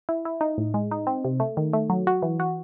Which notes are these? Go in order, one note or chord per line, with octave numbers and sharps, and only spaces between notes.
E4
E4
D#4
A2
G#3
D#4
C4
C3
A3
D#3
A3
F#3
F#4
E3
F#4